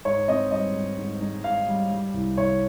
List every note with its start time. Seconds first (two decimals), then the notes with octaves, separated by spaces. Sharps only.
0.05 G#2 C#5
0.28 C4 D#5
0.51 G3 D#5
0.75 G#2
0.98 G#2
1.21 G#2
1.44 G#2 F5
1.68 G3
1.91 G3
2.14 C2
2.38 C2 C#5